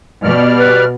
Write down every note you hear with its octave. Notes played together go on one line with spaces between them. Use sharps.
B2 G3 D5 F6
B4